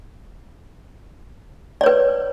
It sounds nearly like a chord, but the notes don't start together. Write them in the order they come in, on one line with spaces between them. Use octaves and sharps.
D5 C#5 B4